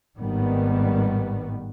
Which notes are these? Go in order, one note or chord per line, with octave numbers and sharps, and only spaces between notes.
G#1 A2 D#3 G3 B3